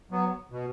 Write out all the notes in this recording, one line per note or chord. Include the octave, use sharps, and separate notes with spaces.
F#3 B3
B2